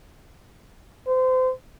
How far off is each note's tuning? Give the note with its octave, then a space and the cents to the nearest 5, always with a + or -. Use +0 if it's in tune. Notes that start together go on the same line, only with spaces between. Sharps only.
C5 -30